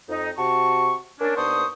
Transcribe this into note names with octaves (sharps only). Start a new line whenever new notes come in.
F2 D#4
C3 F#4 A5 C#6
A#3 C#4 D4
D#2 B3 D4 C5 C#6 D#6